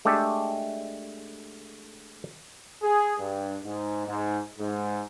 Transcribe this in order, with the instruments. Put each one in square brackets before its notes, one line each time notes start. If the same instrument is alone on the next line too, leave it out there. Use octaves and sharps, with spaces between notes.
[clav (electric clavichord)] G#3 A3 D4 G4 A4
[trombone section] G#4
G2
G#2
G#2
G#2